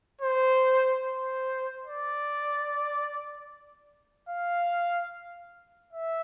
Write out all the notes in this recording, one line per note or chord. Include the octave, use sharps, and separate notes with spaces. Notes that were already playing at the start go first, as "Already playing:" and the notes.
C5
C5
D5
F5
E5